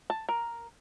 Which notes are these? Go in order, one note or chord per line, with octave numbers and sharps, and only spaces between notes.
A5
A#4